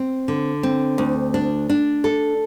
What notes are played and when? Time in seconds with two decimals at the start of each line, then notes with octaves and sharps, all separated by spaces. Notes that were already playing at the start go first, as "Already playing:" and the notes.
Already playing: C4
0.28 D3
0.63 C4
0.98 D2
1.34 D4
1.69 D4
2.04 A4